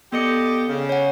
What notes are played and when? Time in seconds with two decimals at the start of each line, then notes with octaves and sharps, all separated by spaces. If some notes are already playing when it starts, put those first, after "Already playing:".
0.12 B3 G4 A4 D5 D#5 C#7
0.69 C#3
0.89 C#5 F#5